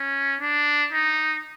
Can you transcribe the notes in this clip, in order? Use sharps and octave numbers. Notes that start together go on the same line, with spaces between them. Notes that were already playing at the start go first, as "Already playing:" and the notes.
Already playing: C#4
D4
D#4